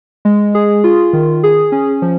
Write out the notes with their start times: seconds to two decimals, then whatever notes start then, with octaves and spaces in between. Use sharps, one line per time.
0.25 G#3
0.55 G#4
0.84 F4
1.13 D#3
1.43 G#4
1.72 C#4
2.02 F3